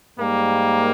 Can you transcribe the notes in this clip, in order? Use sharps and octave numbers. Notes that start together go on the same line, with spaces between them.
G#2 G3 A#3